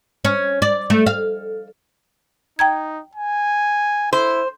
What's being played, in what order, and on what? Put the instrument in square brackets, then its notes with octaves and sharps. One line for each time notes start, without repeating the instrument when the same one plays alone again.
[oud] C#4
D5
A3
F5
[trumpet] D#4 [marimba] G5 A#5 G#6
[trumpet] G#5
[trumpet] E4 [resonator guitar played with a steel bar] C5